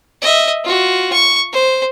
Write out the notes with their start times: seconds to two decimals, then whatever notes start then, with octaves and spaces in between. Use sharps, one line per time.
0.22 D#5 E5
0.64 F4 F#4
1.13 C#6
1.53 C5